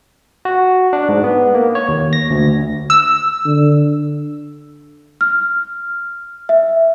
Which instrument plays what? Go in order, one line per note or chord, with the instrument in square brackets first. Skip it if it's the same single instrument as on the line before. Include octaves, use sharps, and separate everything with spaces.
[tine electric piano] F#4
D4
G#2
B3
A#3
C#5
D#2
A#6
D2
[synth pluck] E6
[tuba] D3
[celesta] F6
E5